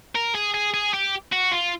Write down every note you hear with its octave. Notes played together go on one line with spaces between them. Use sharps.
A#4
G#4
G#4
G#4
G4
F#4
F4